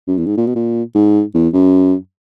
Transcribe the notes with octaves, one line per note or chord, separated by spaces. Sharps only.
F#2
E2
G#2
A#2
B2
A#2
G#2
E2
F#2